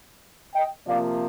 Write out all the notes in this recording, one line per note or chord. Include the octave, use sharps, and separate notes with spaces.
D#5 G5
C3 F3 A#3 D5 F5